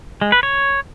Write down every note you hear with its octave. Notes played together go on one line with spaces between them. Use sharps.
G#3
B4
C#5